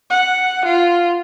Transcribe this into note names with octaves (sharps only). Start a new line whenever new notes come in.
F#5
F4